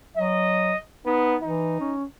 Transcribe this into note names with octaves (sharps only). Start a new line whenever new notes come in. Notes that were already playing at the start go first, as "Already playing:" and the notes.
F#3 D#5
B3 D#4
E3 D#4
C#4